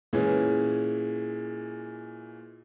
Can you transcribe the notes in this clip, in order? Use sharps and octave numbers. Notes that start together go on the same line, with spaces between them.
A#2 E3 G#3 C#4 G#4